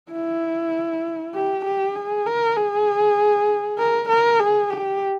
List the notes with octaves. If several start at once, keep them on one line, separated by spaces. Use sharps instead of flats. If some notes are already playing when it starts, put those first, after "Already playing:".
E4
G4
G4
G#4
A#4
G#4
A#4
A#4
G#4
G4